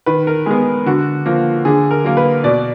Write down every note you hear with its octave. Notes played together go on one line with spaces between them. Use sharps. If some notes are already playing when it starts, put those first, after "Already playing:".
D#3 B4
A#4
G#3 B3 G#4
D3 F#4
F3 A#3
D3 G#4
A#4
F#3 A#3
B4
B2 D5